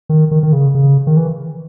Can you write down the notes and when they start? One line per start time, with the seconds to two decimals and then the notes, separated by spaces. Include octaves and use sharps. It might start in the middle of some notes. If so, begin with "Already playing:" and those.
0.09 D#3
0.31 D#3
0.43 D#3
0.53 C#3
0.75 C#3
1.07 D#3
1.17 E3